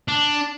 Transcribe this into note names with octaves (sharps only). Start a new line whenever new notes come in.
D4